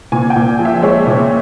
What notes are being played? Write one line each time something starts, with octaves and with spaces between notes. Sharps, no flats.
A#2 G#5
G5
A#2
F3
E5
G#3 C#5
A#2